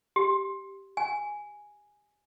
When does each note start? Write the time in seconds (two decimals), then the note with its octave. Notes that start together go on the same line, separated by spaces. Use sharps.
0.16 G4
0.97 G#5